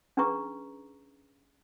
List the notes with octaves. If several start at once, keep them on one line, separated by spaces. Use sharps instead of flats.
C#4 D4 G#4 B4 A#5 C#6